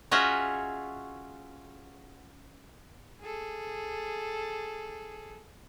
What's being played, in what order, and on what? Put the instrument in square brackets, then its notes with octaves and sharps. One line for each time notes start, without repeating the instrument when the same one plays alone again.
[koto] C#4 F4 F#4 G#4 D#5 E5
[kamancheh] G#4 A4